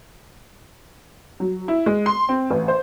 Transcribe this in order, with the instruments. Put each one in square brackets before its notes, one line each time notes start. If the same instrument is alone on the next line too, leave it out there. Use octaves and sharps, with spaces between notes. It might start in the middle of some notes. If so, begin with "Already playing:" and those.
[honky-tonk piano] F#3
E4
G#3
C6
C4
A1
C5